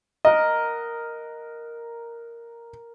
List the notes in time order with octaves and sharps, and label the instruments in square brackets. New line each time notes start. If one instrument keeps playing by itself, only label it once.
[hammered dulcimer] A#4 F#5 [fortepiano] D#5